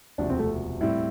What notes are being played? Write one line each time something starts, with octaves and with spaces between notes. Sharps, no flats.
E1 D2 C3 F3 D4
C4
A3
A2 G3 C4 E4